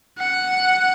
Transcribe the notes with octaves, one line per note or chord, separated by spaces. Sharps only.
F#5